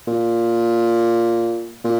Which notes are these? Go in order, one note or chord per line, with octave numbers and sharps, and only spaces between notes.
A#2
A#2